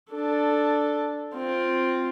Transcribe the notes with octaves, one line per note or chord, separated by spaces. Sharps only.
D4 A4
C4 F4